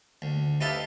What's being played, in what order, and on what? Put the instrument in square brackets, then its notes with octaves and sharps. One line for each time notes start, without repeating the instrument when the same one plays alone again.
[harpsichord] D2
D#4 G4 B4 E5 F5 A5